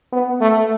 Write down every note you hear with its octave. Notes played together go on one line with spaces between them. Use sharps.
B3
A3